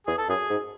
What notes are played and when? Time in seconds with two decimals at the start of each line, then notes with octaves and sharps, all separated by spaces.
0.07 E2 G#4
0.18 A4
0.28 F#2 G#4
0.49 G#2